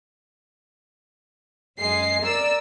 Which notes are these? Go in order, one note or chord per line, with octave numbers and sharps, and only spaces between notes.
F#2 G#3 C7
A#4 D5 E6